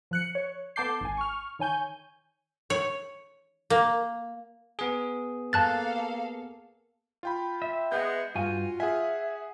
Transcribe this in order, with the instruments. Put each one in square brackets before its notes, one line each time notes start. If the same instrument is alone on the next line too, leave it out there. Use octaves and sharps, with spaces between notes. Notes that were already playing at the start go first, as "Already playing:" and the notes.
[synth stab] F3 F#6 C#7
C#5
B3 A4 A5 D6 G6 C7
G#1 G#5
C#6 F6
D#3 C#5 G#5 G6
[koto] C#5
A#3
[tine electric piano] B3 G#4
[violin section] A#3 A4 F5 [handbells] A5 F#6 A6
[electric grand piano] F4 G5 B5
[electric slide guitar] E5
[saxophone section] G#3 B3 [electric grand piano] G6
[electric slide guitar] G2 G#5 [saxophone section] F4 [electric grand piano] F#4
[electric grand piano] G#4 F#5 G#5 [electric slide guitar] E5